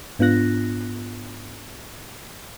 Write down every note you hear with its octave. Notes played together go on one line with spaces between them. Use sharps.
G#2 B3 D4 F4 F#6 A#6